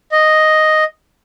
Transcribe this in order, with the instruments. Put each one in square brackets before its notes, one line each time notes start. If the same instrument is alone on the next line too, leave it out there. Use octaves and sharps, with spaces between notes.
[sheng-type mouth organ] D#5